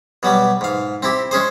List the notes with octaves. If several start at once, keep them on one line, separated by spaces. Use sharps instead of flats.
B2 F#3 G3
G#2 F5
C4 E4 G4
G#3 C#4 G#4 C5